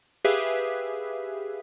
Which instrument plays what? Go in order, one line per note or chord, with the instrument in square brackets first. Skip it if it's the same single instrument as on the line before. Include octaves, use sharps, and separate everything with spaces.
[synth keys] G4 G#4 B4 E5 F5